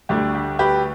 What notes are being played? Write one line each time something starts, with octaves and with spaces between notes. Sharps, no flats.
D2 D3 G3 G4
G4
G4 B4